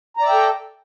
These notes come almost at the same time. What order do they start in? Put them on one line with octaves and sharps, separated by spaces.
A#5 D5 E5 G5 A4